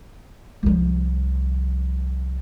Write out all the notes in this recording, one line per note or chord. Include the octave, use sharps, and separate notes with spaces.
C2 F3